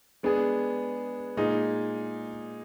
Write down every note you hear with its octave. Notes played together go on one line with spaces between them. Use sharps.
G#3 B3 D4 G#4
A#2 G#3 D#4 G#4